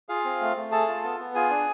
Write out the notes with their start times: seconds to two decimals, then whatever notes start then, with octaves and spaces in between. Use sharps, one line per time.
0.09 F4 G#4 F5
0.25 C4
0.41 A3
0.56 A3
0.71 G#4 A4 A5
0.88 F4
1.03 B3
1.19 B3
1.35 F4 G#4 G#5
1.50 D4